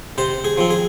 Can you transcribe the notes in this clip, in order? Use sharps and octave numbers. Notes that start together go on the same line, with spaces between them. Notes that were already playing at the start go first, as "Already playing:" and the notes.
C3 C5
G#4
F3 C4
G#4